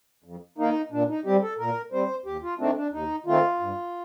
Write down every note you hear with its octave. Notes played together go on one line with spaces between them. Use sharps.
F2
D#3 A#3 D#4
A#2 D4
D#4
G3 C4 G4
A4
A#2 A#4
G3 C4 C5
D#2 G4
F4
D#3 A3 C4 D4
D4
D#2 D#4
D#3 A3 C4 F4
G2